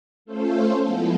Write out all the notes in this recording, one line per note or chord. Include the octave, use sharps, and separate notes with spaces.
A3 C#4 F4 A4 C5
F3 G#3 B3 E4 A4